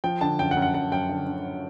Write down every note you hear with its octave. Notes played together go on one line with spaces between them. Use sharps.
F3 G5
D3 A5
F#2 G5
F#5
F#2
F#5
F#2 F#5
F#2 G5
D3
D3